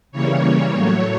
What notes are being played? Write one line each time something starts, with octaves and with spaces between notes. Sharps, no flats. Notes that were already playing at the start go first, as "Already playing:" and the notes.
C#3 E3 G3 A#3 C#5
C#5
A2 F#3 A3